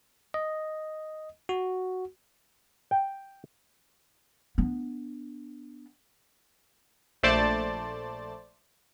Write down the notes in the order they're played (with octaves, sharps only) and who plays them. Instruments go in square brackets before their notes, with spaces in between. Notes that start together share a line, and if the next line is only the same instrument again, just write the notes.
[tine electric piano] D#5
F#4
[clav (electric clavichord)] G5
[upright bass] B3 D4
[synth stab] A#1 A3 C5 D5 A5 A6